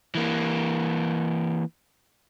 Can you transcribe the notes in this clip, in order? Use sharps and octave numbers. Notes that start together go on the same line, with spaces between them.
E3 A#3